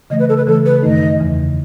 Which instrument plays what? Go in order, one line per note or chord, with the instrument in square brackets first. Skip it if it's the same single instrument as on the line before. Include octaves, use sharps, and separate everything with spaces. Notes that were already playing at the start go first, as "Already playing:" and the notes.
[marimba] C#3 E3 A3 [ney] D#5
[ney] B4
A4
B4
[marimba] C#3 E3 A3 [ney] A4
[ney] B4
[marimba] F#2 D#3 A3 D#4 [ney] D#5
[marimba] E2 C#3 E3